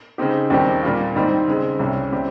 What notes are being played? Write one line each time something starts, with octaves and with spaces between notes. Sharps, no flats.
C#3 G#3 C4 D#4 G4
D#2 D#3 G3 C4 G4
A#2 G3 A#3 F4
G#2 D#3 G3 C4 D#4
C#3 G#3 C4
C2 C3 G3 C#4
G3 C4 G4